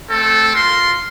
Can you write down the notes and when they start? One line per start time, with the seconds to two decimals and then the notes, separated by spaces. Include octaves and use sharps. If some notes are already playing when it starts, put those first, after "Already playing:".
0.10 A3 C4 A4
0.55 F4 A#4 C6